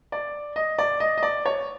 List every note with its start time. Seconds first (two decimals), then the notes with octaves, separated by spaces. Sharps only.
0.12 D5
0.56 D#5
0.78 D5
1.00 D#5
1.18 D#5
1.23 D5
1.46 C#5